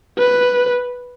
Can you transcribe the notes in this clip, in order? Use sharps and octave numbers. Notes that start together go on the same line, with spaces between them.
B4